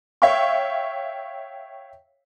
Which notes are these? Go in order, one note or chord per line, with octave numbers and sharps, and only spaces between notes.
C#5 E5 F5 G5 C#6